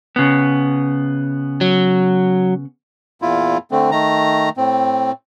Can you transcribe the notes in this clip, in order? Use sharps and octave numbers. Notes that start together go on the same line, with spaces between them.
C#3 B3
F#3
E2 A#2 E4 F4
D3 A3 C4
D#3 A3 A#5
A2 C4